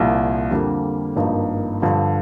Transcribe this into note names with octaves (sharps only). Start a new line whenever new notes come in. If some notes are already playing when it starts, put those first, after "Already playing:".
Already playing: C2 A#2 F3
F2 D3 G3 A#3
G#1 G2 F3 A#3 D#4
G2 D3 F3